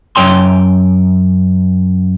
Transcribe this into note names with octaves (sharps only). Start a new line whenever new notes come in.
F#2 C#5 G5 C6